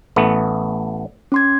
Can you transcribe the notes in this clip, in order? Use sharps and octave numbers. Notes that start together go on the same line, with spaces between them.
A1 A3 B3
C#4 C6 G#6